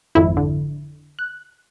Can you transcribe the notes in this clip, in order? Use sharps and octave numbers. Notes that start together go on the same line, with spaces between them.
G#1 F2 E4
D3
F#6